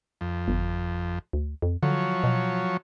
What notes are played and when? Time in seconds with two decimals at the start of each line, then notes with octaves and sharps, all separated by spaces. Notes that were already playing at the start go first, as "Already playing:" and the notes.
0.21 F2
0.48 G1
1.33 D2
1.62 F2
1.83 D3 F3 F#3 C#5
2.24 B2